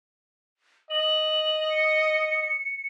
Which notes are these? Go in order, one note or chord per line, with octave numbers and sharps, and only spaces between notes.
D#5 F#7
C#7